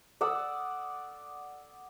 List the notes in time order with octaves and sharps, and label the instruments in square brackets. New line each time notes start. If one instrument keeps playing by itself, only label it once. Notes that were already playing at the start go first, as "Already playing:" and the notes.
[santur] D5 F#5 D#6 E6